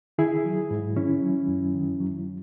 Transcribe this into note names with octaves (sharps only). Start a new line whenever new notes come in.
D#3 E4 G#4
F#3
G#2
D#3 C#4 E4
F#3
F#2
D#3
F#3